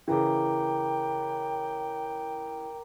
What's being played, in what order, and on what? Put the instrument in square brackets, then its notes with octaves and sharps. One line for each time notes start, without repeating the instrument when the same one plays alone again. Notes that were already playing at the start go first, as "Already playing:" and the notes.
[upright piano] C#3 E3 [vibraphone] A#4 A#5 D6 [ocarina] G5